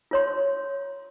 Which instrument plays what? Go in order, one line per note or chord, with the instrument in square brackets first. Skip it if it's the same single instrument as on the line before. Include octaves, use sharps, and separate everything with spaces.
[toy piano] F4 C#5 C6